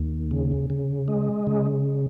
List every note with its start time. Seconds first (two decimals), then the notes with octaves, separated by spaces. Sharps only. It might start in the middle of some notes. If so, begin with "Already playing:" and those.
Already playing: D#2
0.31 C#3
0.70 C#3
1.08 G#3
1.47 C#3